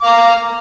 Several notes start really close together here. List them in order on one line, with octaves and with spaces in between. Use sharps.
D6 F5 A#5